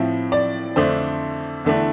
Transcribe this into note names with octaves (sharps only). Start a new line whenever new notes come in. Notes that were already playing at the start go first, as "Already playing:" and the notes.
Already playing: A2 F3 C4 E5
D5
F2 D3 A3 D4 C5
E2 D3 A3 D4